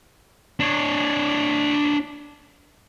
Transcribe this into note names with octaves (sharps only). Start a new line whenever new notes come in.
D4 C#5